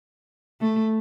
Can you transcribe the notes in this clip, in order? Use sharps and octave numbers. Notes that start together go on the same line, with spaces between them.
A3